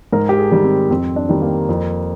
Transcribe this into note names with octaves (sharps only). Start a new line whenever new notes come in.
G#2 A#4
G4
G#4
D#3 G3
C4
F2 C4
D4
D#3 G3
A#3
F2